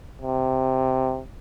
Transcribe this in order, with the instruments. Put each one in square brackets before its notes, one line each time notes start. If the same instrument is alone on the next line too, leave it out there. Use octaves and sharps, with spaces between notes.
[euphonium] C3